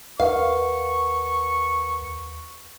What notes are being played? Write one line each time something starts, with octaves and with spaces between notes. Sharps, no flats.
D#2 A#4 B4 F5 F#5 C#6